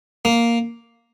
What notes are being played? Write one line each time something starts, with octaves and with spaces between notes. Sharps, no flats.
A#3